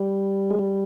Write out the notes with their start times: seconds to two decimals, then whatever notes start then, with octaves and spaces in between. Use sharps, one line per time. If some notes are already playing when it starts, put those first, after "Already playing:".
Already playing: G3
0.50 G#3
0.59 G3